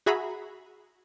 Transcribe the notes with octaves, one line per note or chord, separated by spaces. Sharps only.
F#4 G#4 E5 A#5 B5